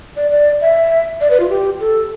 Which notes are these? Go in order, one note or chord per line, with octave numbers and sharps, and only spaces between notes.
D5
D5
E5
D5
B4
F4
G4
A4